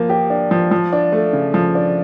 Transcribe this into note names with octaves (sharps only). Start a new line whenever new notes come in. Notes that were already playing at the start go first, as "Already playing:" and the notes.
Already playing: F3 A#3
G4
D4
F3
F3
D4
A3
C#3
F3
D4